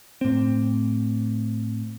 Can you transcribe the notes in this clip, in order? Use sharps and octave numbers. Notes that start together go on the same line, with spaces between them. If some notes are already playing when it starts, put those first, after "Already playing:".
A2 C4